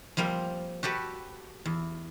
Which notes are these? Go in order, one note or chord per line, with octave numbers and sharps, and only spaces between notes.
F3 G3 A#3 C4
F#4 G4 A4 B4
E2